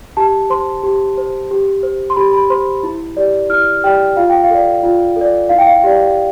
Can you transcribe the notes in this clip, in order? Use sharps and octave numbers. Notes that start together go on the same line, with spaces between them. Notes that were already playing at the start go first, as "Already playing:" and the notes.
G4 A5
C5 C6
G4
C5
G4
C5
C6
G4 B5
B5
C5 C6
E4
G4 D5
E4 F6
G4 D5 G5
F4 F5
G5
F5
A4 D5
F4
A4
D5
E4 F5
G5
F5
G4 D5